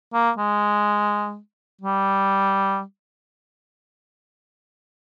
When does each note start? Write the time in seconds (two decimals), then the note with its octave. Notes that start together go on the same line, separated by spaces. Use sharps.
0.14 A#3
0.38 G#3
1.81 G3